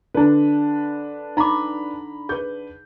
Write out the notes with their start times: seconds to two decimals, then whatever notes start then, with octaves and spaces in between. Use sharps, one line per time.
0.14 D3 D4 B4
1.37 D#4 A#5 B5 D6
2.29 G#4 B4 G6